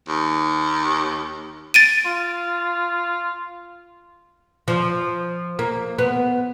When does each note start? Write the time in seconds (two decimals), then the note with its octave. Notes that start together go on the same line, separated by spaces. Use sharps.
0.08 D#2
1.74 A6 D7 D#7
2.05 F4
4.68 F3
5.59 A#3
5.99 B3